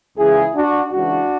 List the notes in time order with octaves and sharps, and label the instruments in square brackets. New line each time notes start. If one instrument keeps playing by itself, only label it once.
[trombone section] C#2 C#3 E3 E4 G#4
D4 F#4
C#2 C#3 E3 D4 F#4